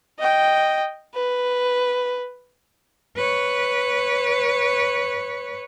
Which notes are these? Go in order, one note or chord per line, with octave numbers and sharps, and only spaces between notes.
D#5 G5
B4
B4 C#5